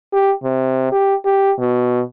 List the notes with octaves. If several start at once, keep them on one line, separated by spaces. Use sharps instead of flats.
G4
C3
G4
G4
B2